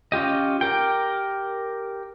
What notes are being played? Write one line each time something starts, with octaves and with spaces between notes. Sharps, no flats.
C#4 F4 G4 D#5
G4 A#4 G5